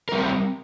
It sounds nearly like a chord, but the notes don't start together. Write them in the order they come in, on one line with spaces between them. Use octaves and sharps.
A#4 G3 C4